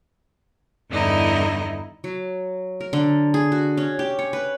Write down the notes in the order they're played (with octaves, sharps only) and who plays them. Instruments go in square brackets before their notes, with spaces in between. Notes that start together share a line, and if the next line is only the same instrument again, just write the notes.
[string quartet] E2 G2 D3 D#4 E4 D#5
[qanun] F#3
A#4
D3
G#4
F#4
C#4
G4
C#5
B4